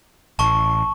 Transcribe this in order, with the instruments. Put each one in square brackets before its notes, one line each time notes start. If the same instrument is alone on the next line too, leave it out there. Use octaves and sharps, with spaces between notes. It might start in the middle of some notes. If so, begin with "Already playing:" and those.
[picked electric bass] A1 [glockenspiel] A5 C#6